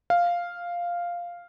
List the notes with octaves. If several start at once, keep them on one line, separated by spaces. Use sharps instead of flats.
F5